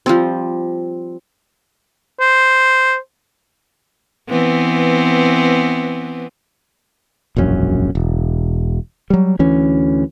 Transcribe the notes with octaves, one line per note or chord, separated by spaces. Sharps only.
F3 G3 C4
C5
E3 B3 C4
E1 A#1 F#2 C#4
E1
F#3 G3
D2 E3 C#4